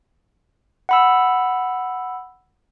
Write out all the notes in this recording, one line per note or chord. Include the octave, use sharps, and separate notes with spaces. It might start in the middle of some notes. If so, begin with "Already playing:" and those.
F#5 B5 E6